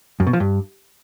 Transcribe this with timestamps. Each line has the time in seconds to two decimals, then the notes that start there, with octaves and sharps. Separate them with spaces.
0.20 F#2
0.27 B2
0.33 F3
0.40 G2